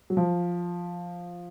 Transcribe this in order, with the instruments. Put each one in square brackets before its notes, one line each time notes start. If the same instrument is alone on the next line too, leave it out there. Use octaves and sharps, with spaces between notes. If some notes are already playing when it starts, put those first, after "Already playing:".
[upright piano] F#3
F3